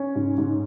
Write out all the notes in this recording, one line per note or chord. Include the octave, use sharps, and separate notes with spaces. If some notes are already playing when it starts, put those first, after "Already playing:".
Already playing: C#4
G#2
G#2